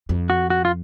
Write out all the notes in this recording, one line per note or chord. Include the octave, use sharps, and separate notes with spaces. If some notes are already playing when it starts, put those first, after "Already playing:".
F2
F#4
F#4
F4